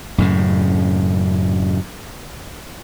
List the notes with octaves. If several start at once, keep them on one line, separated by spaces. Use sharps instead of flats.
F#2 A2 C#3